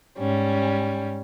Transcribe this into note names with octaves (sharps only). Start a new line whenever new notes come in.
G#2 G3 C#4